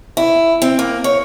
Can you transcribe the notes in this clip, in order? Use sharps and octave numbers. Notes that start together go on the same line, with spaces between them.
E4
C4
A#3
C#5